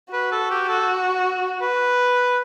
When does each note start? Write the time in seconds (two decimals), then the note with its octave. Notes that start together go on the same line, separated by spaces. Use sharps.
0.13 F#4 B4
0.32 A4
0.51 G4
0.69 A4
1.62 B4